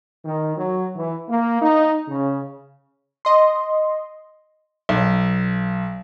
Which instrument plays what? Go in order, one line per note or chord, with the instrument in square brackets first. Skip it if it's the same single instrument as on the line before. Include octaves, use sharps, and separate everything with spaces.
[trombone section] D#3
F#3
E3
A#3
D#4
C#3
[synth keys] D#5 C6
[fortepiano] B1